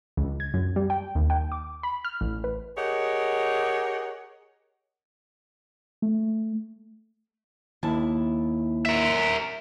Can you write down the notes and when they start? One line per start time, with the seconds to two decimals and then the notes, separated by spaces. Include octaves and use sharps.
0.17 C#2
0.40 G#6
0.54 F#2
0.76 G3
0.90 G5
1.15 D#2
1.30 G5
1.52 D6
1.83 B5
2.05 F6
2.21 A1
2.44 B4
2.77 G4 G#4 A#4 C#5 D#5 F#5
6.02 A3
7.83 D#2 E4 A5
8.86 A#4 E5